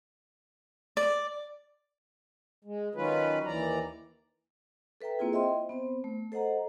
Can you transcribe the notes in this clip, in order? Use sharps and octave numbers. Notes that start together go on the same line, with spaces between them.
D5
G#3
D#3 F#3 C#4 F4 B4
D#2 E3 D5 A#5
A4 B4 E5 G5 A#5
A#3 C4 E4 F4 G#4
C5 D#5 E5 G5 C6
B3 C4 C5
A3
A4 C5 D#5 F#5 A#5